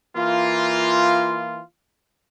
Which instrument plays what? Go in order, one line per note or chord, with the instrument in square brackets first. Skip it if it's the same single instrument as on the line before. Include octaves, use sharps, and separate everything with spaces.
[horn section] E3 A#3 F4